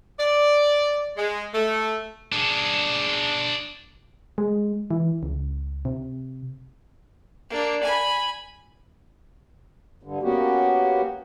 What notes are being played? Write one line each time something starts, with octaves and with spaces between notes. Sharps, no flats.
D5
G#3
A3
D4 G#4
G#3
E3
C#2
C3
A#3 D4
G#5 B5
G2 D3
A#3 B3 C#4 F#4 G4